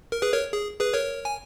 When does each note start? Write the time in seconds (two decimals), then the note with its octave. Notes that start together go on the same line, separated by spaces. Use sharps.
0.12 A#4
0.22 G#4 B4
0.33 A#4 C#5
0.53 G#4
0.80 G#4 B4
0.94 A#4 C#5
1.25 G#5